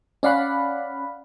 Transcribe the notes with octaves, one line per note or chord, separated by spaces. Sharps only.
C#4 D5 F5 F#5 B5